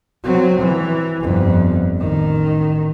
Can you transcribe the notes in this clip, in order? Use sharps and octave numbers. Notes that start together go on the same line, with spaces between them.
F#3 C4
E3
G1 F2
A1 D#3